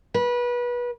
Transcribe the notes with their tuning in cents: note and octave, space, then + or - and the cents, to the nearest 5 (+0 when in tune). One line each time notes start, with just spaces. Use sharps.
B4 -25